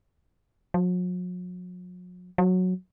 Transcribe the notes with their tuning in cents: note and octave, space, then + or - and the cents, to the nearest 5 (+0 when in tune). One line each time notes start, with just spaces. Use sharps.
F#3 -45
F#3 -10